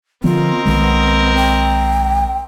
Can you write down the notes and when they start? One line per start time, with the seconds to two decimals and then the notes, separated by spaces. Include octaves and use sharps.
0.24 D3 F3 B3 C4 F4 A#4 D#5
0.66 B1 D#3 G#3 B3
1.36 G5